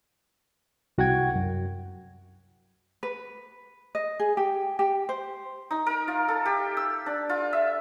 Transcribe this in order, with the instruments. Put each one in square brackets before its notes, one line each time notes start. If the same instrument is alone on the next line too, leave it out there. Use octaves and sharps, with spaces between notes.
[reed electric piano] C2 F#4 F#5 G5 G#6
F#2
[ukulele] B4
D#5
G#4
G4
G4
C5
[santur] D#4
A#4
F4
A4
G4
E6
D4
F4
E5